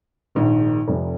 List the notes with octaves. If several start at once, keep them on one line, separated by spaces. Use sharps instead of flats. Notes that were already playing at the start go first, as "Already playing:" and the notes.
A#1 G#2 D#3
F1 F2 C3